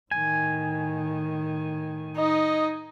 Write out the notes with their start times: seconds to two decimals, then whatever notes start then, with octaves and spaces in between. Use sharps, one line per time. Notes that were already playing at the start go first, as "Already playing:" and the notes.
0.11 A2 D#3 G#5
2.17 D#4 D#5